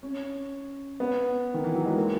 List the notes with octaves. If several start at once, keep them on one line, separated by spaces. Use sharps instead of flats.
C#4
B3
D#3
E3
F#3
G#3
A#3